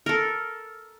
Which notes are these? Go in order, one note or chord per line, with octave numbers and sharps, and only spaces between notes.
A4 A#4